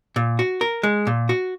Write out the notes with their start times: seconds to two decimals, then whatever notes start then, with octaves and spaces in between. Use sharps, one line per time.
0.16 A#2
0.39 F#4
0.61 A#4
0.83 G#3
1.07 A#2
1.29 F#4